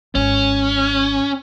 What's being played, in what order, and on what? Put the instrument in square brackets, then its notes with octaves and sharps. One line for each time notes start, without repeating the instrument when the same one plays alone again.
[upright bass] G#1 [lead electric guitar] C#4